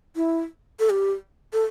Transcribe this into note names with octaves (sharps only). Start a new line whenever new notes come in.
E4
A4
G4
A4